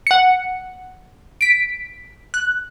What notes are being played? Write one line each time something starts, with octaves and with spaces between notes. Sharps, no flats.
F#5 C#7
B6 D7
F#6